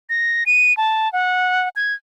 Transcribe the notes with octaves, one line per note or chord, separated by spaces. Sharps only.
A#6
D#7
A5
F#5
G#6